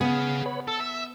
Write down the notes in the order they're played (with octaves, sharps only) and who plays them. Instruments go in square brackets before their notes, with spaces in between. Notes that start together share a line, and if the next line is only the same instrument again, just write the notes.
[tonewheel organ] C#3 [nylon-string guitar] B3 [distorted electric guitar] G#4 F5
[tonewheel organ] B4 C#5 B5
[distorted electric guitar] A4 [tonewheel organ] E6
[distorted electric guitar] E5